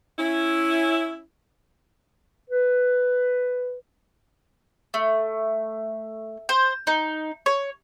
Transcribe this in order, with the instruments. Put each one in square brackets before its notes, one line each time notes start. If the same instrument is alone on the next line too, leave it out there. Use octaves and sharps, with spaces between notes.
[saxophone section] C#4 E4
[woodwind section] B4
[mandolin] A3
C5
D#4
C#5